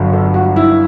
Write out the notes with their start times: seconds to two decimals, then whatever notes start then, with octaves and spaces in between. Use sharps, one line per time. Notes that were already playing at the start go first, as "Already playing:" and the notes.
Already playing: G1 G2 D3 F#3
0.13 A4
0.34 F#4
0.56 E4